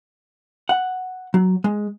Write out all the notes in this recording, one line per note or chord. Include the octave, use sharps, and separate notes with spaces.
F#5
F#3
G#3